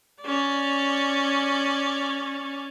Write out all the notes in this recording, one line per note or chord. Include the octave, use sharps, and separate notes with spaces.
C#4 D5